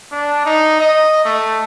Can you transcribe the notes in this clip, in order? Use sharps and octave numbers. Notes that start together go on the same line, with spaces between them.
D4
D#4
D#5
A3